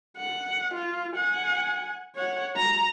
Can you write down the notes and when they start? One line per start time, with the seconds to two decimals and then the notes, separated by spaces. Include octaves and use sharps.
0.17 F#5
0.75 F4
1.16 F#5 G#5
2.15 C#5 F#5
2.56 A#5